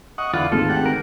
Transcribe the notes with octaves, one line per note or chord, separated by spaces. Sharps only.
D#5 F#5 C#6 D#6
E2 D3 F4 F#5
G#1 D2 G#2 F4 A4
G4 F#5
A#4